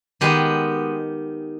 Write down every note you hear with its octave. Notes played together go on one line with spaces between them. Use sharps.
D#3 G#3 B3 G4